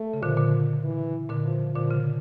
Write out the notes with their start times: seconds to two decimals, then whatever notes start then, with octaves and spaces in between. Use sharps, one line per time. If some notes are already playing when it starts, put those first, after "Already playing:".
Already playing: A3
0.14 C#3
0.22 A#2 D3 F3
0.37 A#2 D3
0.84 E3
1.29 A#2 D3
1.45 F3
1.74 A#2 D3 F3
1.91 C#3